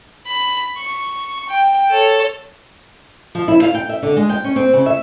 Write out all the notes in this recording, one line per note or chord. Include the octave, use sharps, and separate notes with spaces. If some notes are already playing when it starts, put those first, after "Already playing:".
B5
C#6
G5
A4 C#5
F3
E4
F5
G5
E5
D3
G#3
G5
C#4
C4
C#3
E5